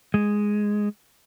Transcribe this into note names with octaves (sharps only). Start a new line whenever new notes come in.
G#3